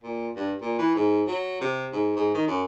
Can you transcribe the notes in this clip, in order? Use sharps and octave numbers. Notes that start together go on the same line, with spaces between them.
A#2
G2
A#2
E3
G#2
F#3
C3
G#2
G#2
D#3
F#2